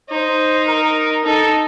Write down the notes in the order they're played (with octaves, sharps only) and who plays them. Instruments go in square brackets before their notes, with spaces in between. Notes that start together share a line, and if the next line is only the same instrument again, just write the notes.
[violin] D#4 [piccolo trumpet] C5
[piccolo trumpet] A#4
[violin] D#4 [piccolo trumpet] A4